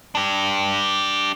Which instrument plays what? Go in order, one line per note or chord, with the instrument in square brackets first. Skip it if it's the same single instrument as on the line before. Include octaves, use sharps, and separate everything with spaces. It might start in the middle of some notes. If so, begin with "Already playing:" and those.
[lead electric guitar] D4 G4